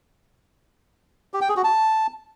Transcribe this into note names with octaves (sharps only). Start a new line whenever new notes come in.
G4
G5
G#4
F#4
A5